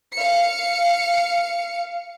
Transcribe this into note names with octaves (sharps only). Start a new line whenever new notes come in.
F5 C#7